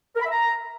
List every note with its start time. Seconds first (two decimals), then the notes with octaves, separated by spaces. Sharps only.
0.16 A#4
0.21 B5
0.26 E5
0.31 A#5